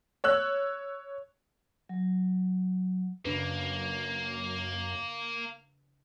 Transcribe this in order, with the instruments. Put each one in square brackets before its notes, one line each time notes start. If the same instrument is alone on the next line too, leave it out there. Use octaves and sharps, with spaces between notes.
[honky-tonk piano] C#5 E6 F#6
[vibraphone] F#3
[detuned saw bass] F#2 [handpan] C#3 D4 B4 [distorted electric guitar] A#3